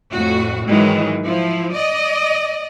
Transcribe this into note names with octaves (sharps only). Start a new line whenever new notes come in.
F2 A2 F#4
G#2 D#3 E3 F#3 G#3
F3 E4
D5 D#5